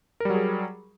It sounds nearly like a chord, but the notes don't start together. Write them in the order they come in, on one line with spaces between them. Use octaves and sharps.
A#4 G3 F#3 G#4